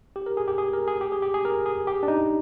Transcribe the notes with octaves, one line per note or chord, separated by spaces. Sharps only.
G4
A#4
G#4
G4
G#4
A#4
G#4
G4
G#4
G4
G#4
A#4
G#4
G4
D4
D#4